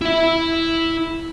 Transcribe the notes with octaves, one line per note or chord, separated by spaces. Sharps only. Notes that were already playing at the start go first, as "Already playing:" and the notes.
E4 E5